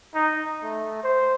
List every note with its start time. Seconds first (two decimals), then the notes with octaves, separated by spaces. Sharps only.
0.15 D#4
0.63 A3
1.03 C5